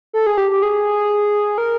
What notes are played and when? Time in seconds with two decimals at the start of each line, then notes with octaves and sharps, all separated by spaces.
0.13 A4
0.27 G#4
0.38 G4
0.51 G4
0.62 G#4
1.58 A#4